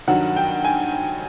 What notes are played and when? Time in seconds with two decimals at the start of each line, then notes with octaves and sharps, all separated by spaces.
0.08 G2 D#3 F#3 F#5
0.36 G5
0.65 G#5